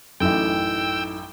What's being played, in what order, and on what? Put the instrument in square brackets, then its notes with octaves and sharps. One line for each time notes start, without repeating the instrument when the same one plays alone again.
[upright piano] A1 F#2 [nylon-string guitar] D#4 E4 A4 [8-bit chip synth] G5 E6